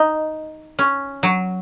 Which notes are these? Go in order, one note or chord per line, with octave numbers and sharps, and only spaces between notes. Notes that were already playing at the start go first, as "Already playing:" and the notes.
Already playing: D#4
C#4
F#3